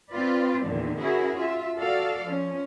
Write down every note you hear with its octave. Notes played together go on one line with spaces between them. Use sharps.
C4 F4 B4 D5
E2 A#2 D3 D#3
C#4 E4 F#4 G#4 A#4
F4 E5
F#4 A4 D5 F5
F3 C#4